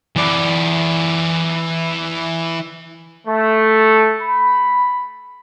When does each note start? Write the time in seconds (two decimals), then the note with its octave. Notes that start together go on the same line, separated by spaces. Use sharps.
0.16 E3 D5
3.27 A3
4.22 B5